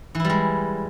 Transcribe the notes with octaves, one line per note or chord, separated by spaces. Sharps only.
E3 G3 G#3 E4